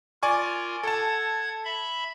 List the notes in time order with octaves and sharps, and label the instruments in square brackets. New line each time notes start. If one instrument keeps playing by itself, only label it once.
[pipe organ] F4 A#4 [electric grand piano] D5 G#5 C#6
[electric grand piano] A4 A5 [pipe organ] F#5 G#6
[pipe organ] E5 B5